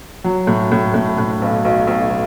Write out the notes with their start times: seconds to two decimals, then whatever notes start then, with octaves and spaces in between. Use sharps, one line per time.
0.24 F#3
0.47 A2
0.72 A2
0.94 A2
1.18 A2
1.42 B1
1.65 B1
1.87 B1